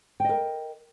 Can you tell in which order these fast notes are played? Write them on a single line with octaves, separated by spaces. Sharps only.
G5 D#5 A#4